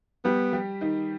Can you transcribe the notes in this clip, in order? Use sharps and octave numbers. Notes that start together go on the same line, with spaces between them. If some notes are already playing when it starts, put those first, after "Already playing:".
G3 B3 G4
G3 G4
D#3 D#4